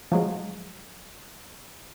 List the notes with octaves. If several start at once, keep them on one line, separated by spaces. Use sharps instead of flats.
F3 F#3 G#3